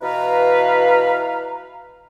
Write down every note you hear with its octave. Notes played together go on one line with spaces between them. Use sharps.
B2 E3 B4 F5 A#5